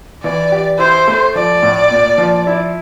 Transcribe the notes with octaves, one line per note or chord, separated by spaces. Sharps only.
E3 D5
G4
E4 C5
A3
F3 D5
A2
A#2
F3
E4